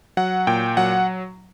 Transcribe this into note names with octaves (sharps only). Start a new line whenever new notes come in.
F#3 F#5
A#2 G5
F#3 F#5